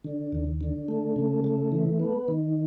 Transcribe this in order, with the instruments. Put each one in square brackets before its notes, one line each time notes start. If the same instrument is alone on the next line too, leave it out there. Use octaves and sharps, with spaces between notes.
[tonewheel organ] D3
D#2
D3
A3
C#3
A3
E3
B3
D#3